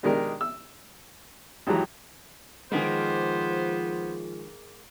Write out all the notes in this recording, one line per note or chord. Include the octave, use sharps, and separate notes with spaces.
B2 D#3 G#3 D4 G4 A#4
E6
G#1 E3 F#3 G4 A#5
D#3 F3 G#3 A#3 B3 G#4 C5